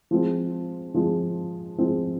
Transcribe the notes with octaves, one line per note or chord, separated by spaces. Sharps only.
F3 G#3 C4
F3 G#3 C4
F3 G#3 C4